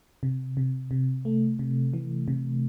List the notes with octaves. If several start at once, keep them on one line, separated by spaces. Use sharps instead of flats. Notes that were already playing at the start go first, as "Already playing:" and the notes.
C3
C3
C3
A3
C3
E3
C3